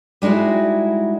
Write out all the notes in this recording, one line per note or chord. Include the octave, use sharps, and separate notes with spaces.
G3 G#3 D#4 E4 F#4